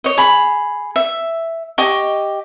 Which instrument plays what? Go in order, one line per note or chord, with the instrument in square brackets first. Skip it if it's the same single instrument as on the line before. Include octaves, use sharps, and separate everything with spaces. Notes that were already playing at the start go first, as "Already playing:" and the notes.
[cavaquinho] C#5 D#5
G#4 B5
E5
G4 D#5 C#6